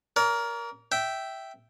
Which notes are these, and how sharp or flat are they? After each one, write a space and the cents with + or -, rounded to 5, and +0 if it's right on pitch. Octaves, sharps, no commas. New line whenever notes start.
A#4 +10 D5 -45
E5 +0 G5 -10